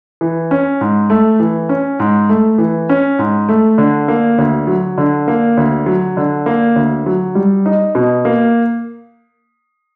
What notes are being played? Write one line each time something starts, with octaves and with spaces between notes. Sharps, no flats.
E3
C#4
G#2
A3
E3
C#4
G#2
A3
E3
C#4
G#2
A3
D3
A#3
D2
F#3
D3
A#3
D2
F#3
D3
A#3
D2
F#3
G3
D#4
B2
A#3